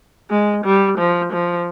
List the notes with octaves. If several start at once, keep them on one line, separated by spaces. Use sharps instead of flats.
G#3
G3
F3
F3